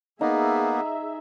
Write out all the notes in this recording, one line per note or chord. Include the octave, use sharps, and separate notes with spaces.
A#3 B3 D#4 G#4 E5